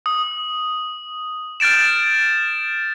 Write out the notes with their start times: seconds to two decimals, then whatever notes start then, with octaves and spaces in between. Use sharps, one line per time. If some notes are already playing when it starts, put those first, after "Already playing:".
0.06 D#6
1.60 F6 G6 A6 D7 E7